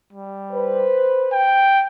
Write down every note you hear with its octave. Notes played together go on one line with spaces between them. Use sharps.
G3
B4 C5
G5